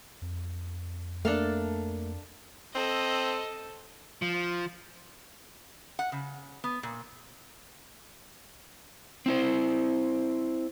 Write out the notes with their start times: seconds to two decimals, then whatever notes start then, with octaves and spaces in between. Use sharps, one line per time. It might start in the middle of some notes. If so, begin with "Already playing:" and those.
0.22 F2
1.25 A3 A#3 D4 A4 F5
2.75 C4 A4 D#5
4.22 F3
5.99 F#5
6.12 C#3
6.64 B3
6.83 A#2
9.26 C4 E4 C5